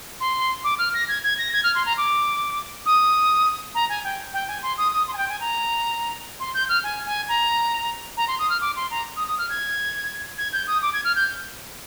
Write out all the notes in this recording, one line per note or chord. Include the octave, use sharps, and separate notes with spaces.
C6
D6
F6
A#6
G#6
G#6
A#6
G#6
F6
C6
A#5
D6
D#6
A#5
G#5
G5
G5
G#5
C6
D#6
D#6
C6
G#5
G5
G#5
A#5
C6
G6
F6
G#5
G#5
A#5
A#5
C6
D#6
F6
D6
C6
A#5
D#6
D#6
F6
G#6
G#6
G6
D#6
D6
G#6
F6
G6